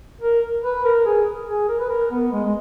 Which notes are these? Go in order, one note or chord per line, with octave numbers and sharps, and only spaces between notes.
A#4
B4
A#4
G#4
G#4
A#4
B4
A#4
B3
G#3
G#3